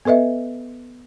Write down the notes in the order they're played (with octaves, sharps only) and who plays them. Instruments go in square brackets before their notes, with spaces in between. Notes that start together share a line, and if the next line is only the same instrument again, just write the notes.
[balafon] B3 A4 B4 D#5 E5